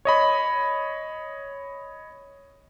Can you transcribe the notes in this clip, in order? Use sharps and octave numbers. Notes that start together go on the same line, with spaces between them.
C#5 D#5 B5